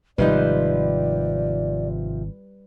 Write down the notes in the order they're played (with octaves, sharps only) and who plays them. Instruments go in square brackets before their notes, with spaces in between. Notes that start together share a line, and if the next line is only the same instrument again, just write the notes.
[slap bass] G#1 [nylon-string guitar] C3 F3 D#4 [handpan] G3 B4 [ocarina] D5